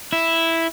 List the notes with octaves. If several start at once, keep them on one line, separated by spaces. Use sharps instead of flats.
E4